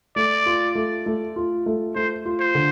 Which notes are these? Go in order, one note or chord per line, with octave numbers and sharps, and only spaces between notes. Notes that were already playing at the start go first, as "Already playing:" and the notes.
A3 D5
F4
A3
A3
F4
A3
A3 C5
F4
C5
D3